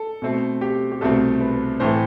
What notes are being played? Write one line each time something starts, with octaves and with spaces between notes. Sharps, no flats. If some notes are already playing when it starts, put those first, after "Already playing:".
Already playing: A4
B2 A3 C4
G4
G4
C2 B2 A3 C4 A4
B4
A2 E3 A3 C5